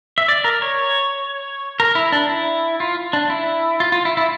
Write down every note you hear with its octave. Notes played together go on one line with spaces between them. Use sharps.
E5
D5
A#4
C#5
A#4
E4
D4
E4
F4
D4
E4
F4
F4
E4
E4